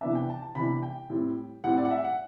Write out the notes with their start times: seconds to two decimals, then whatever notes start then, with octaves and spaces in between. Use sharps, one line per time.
0.01 C3 E3 B3 D4 E5
0.15 G5
0.29 A5
0.42 A5
0.55 C3 E3 B3 D4 B5
0.83 G5
1.10 A2 G3 C4
1.64 A2 G3 C4 F#5
1.78 D5
1.85 F#5
1.91 E5
2.04 F#5